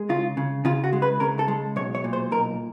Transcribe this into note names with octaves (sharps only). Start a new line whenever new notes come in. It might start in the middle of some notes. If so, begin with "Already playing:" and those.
Already playing: G#3
C#3 F4
C#3
C#3 F4
F#4
G#3
B4
C#3 A#4
A4
G#3
B1 C#5
C#5
A#2
C5
B1 A#4